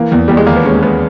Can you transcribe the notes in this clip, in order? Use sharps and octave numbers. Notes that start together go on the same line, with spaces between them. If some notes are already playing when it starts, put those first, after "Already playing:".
Already playing: E3 A#3
E2
E2 G3
G#3
D#2 A#3
B3
G#3 C#4
G#3 B3